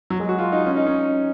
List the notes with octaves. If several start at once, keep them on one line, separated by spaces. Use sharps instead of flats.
F#3
G#3
F#4
F4
D#4
C#4
D#4
C#4